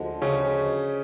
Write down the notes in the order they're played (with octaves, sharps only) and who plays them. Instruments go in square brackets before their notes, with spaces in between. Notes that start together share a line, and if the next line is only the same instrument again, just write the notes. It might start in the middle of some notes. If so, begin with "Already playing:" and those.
Already playing: [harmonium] D2 D3 F3 G#3
[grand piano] C#3 C#4